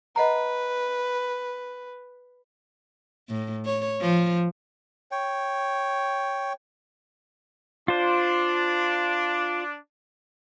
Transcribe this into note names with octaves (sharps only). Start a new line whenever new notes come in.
B4 D#5 F#5 A#5
A2
C#5
F3
C#5 G5
D4 F4 C5